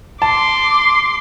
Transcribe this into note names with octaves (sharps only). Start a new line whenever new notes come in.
A5 C6 D6